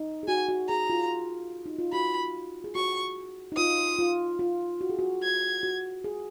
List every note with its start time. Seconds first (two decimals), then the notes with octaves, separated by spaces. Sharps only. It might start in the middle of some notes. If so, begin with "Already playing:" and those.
Already playing: D#4
0.23 G#4
0.28 F#4 G#5
0.49 F#4
0.69 G#4 A#5
0.90 F4
1.66 D#4
1.79 F4
1.92 F#4 B5
2.64 G#4
2.75 F#4 C#6
3.52 D#4
3.57 F4 D#6
3.99 F4
4.39 F4
4.81 F#4
4.90 G#4
4.99 F#4
5.22 G#6
5.63 F#4
6.04 G#4